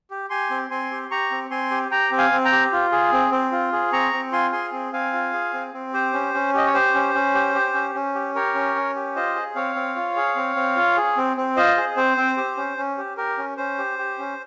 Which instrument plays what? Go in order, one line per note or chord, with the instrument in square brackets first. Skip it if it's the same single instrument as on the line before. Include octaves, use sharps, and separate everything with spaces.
[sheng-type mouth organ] G4
G4 G#5 C6
C4
C4 G#5 C6
G4
G4 A#5 C#6
C4
C4 G#5 C6
G4
G4 G5 A#5
C4
F5 G#5
C4
G5 A#5
G4
F4
G#4
C4
C4
F4
G#4
C4 A#5 C#6
C4
F4 G#5 C6
G#4 G#5 C6
C4
C4 F5 G#5
F4
G#4
C4
C4
G4 C5
C#4
C#4
G4 D#5
C#5
G4 C5
C#4
C#4
G4
G4
C#4
C#4
G4
G4 A#4 C#5
C#4
C#4
G4
F4 C5 D#5
G#4
C4 C#5 F5
C4
F4
G#4
C4
C4
F4
G#4
C4
C4
F4 C5 D#5
G#4
C4 C5
C4
G4
C#4
C#4
G4
G4 A#4
C#4
C#4 C5
G4
G4
C#4